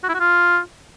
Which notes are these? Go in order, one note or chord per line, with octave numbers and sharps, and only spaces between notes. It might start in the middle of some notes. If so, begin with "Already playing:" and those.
F#4
E4
F#4
F4